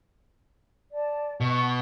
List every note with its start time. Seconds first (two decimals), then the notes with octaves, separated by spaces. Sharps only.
0.93 D5 A5
1.41 B2 C#6